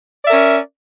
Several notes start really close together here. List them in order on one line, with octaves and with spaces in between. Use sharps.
D5 E5 A#4 C#4